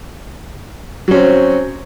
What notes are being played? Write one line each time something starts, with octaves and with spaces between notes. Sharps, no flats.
F#3 C4 C#4